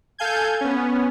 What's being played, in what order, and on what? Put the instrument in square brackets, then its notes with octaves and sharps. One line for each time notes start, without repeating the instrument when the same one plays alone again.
[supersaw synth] A4 F5 G#5 G6 G#6
B3 C#4